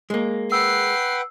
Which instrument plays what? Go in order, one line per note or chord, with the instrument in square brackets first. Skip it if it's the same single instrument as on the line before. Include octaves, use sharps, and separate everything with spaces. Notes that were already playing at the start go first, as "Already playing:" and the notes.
[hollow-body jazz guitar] G#3 A#3
[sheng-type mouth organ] B4 F#5 G5 [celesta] E6 [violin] C7